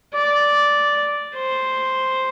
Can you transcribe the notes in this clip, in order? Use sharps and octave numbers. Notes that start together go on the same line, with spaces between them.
D5
C5